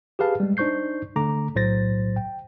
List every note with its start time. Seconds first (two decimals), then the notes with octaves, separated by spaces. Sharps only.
0.19 G4 G#4 B4 F5 A5
0.40 G3 G#3
0.57 D4 D#4 C5 C#6 G6 C7
1.16 D3 A3 A#5 D6
1.55 B1 A2 F#3 C5 A6 A#6
2.16 G5